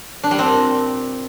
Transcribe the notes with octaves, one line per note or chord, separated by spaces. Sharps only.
D4
G3
C4
A#2